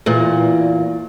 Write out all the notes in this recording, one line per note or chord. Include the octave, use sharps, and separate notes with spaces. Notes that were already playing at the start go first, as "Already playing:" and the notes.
E2 A#2